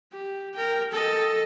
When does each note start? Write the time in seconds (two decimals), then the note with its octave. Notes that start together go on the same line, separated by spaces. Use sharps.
0.12 G4
0.54 A#4 G5
0.92 A4 D#5